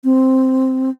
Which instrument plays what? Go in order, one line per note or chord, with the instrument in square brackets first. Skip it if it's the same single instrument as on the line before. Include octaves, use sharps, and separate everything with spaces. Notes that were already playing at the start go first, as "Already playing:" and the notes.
[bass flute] C4